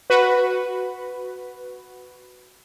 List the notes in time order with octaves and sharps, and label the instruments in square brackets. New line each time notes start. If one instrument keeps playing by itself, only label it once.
[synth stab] F#4 B4